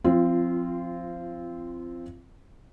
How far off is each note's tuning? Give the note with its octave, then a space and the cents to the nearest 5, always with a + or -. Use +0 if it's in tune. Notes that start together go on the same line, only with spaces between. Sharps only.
F3 +0 C4 +0 F4 -25